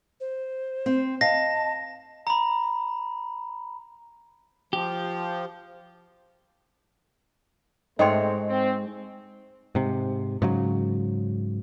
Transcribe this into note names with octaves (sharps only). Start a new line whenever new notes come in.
C5
C4
D#5 F5 A5 A#6
A#5 B5
F3 G4
G#2 G#3 A3 C4 C#5 D#5 G5 C6
C4
G#2 C3
G#2 C#3 F#3